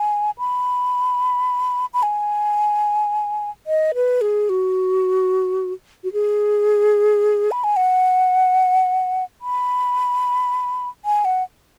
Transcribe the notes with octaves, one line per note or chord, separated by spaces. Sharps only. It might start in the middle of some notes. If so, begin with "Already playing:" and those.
Already playing: G#5
B5
B5
G#5
D#5
B4
G#4
F#4
F#4
G#4
B5
G#5
F#5
B5
G#5
F#5